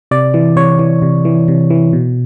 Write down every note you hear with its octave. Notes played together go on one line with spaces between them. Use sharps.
C3 D5
E3
C3 C#5
E3
C3
E3
C3
E3
B2